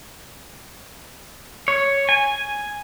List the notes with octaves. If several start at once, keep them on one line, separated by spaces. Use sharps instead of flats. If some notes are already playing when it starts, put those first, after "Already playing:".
C#5
G#5